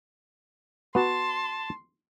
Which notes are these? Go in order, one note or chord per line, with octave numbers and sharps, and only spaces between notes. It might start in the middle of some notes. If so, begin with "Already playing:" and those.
B3 F#4 A5 C6